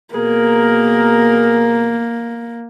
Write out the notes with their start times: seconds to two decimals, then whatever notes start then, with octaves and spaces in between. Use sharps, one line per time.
0.14 B2 A#3 G#4 A#4